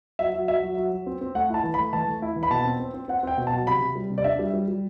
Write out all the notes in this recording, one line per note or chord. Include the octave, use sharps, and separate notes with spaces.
F#3 E5
F#3
F#3 E5
F#3
F#3
F#3
C4
C4
A3 F#5
E4 A5
E3
B5
A3
E3 A5
A3
E4
E3
B5
B2 A5
C4
C4
C4
C4 F#5
C4 G5
B2
A5
F#3
C3 B5
C3
G3
C3
D5
D4 E5
G3
G3
G3